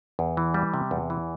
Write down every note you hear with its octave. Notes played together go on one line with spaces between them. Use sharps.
E2
E3
G3
C3
E2
E3